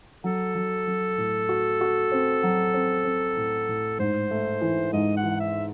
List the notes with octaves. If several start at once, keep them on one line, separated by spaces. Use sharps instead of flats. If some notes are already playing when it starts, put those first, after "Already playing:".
F#3 A4
F#3
F#3
A2
F#4
F#4
C4
F#3
C4
C4
A2
A2
G#2 C5
A3
E3
G#2 D#5
F#5
E3
E5